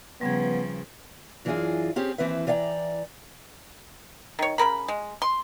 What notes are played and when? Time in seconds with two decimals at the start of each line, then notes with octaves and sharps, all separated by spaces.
0.21 C#3 F3 G3 B3 B4 G#6
1.45 F#2 E3 D4 D#4 F4 G#4
1.96 C4 C#4 G4 G#4
2.18 D#2 C#3 E3 C4 B4 E5
2.47 E3 D5 E5 F5 G5 A#5
4.39 D#3 C#5
4.58 C#3 C4 A#4 B5
4.88 G#3
5.22 C6